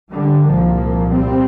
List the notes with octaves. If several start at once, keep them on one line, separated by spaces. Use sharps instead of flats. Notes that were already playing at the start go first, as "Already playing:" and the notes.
D3 G3
C2 A#2 F3 A#3
G3 C4